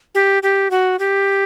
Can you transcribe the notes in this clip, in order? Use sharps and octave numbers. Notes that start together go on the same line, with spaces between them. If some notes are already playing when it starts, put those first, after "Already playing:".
G4
G4
F#4
G4